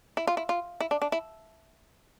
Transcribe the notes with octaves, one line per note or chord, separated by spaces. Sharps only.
E4
F4
E4
F4
E4
D4
D4
E4